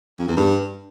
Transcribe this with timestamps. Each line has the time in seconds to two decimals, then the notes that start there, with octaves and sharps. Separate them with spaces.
0.19 F2
0.28 E2
0.37 G2